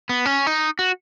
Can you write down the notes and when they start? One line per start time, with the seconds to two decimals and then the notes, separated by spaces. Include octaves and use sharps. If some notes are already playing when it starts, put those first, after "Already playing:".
0.09 B3
0.26 C#4
0.47 D#4
0.79 F#4